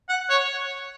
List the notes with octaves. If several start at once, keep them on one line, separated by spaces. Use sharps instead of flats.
F#5
C#5